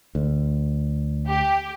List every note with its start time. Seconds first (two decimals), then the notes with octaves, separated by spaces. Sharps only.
0.15 D2
1.27 G4